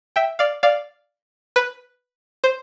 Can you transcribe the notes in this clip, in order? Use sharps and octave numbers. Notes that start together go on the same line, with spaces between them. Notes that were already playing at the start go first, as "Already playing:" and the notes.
E5 G5
D5 F5
D5 F5
B4
C5